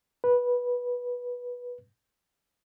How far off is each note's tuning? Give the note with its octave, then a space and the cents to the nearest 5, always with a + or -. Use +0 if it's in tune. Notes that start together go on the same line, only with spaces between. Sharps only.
B4 -15